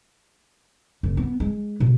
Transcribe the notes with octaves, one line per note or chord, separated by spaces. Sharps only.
F#1
B3
G#3
B2